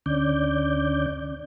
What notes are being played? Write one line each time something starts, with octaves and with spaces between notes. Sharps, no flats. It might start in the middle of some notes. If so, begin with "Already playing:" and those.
D2 D3 C#4 D5 G6